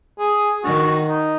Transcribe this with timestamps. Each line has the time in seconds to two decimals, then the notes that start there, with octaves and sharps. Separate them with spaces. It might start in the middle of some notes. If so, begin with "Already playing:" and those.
0.19 G#4
0.64 D#3 F#4
1.09 D#4